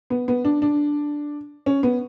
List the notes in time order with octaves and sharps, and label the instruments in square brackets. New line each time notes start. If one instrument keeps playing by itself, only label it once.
[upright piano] B3
B3
D4
D4
C#4
B3